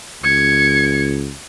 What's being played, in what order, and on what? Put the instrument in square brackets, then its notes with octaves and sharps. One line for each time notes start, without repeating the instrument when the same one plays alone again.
[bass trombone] C#2 [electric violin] G#6 C#7